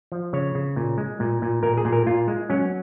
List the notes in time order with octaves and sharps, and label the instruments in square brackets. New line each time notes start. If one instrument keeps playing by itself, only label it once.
[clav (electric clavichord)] F3
C#3 C#5
C#3
A#2
G#3
A#2
A#2
A#2 A#4
G#4
A#2
A#4
A#2 F4
G#3
F#3 C#4